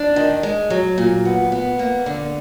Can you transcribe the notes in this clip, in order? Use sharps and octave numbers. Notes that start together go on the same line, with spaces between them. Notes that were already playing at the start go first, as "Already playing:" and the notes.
Already playing: D4
D#3
G#3
F#3
A#2
B3
B3
A#3
D3